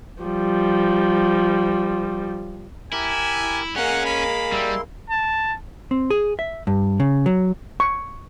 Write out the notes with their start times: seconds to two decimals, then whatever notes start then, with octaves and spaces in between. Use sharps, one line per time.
0.23 F3 G3
2.93 E4 G4 A#4 G#5
3.76 G#3 A#3 C#4 F#5 G#5
4.05 B5
4.52 G3 E4 C6
5.10 A5
5.91 C4
6.10 G#4
6.39 E5
6.67 G2
7.00 C#3
7.26 F#3
7.80 C#6